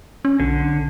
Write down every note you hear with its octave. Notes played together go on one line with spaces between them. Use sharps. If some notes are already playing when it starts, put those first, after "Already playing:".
C#4
B1 D3